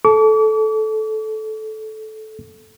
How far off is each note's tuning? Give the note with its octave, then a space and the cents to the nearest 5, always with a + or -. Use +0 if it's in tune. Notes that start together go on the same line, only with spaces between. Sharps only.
A4 -15 D6 -40